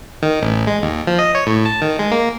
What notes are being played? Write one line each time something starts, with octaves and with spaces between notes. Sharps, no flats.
D#3
A1
G#3
D#2
F3
D#5
C#5
A2
A5
D#3
G#3
A#3